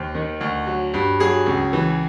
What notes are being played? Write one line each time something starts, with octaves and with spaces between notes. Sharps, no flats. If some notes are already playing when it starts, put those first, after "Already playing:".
Already playing: D#2 C5
D#3
D2
F#3
G2
F#3 G#4
C#2
E3